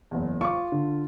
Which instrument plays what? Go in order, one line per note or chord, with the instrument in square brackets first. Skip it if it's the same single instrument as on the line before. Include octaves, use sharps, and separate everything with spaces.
[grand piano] F#1 E2
[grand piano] F4 F5 [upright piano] C#6 D6
[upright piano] D3